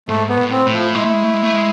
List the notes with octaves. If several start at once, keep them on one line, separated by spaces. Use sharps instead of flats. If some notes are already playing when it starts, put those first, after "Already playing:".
G#2 A3
B3
A2
C4
A2
F3
G#3 E4
A3
G#3
A3
G#3
A3
G#3